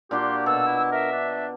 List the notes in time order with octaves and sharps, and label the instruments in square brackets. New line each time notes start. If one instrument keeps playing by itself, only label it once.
[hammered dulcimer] A#2 D4 F#4 [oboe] G4 [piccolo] C6
[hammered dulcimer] B2 [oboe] A4 [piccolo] E6
[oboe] E4
[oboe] A#4 [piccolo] E5
[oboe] D4